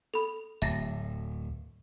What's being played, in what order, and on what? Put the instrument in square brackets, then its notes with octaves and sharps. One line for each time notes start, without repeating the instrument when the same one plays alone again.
[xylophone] A4 B5
[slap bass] D1 [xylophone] E5 A6 A#6